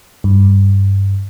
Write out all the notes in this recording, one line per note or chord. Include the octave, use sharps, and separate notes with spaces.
G2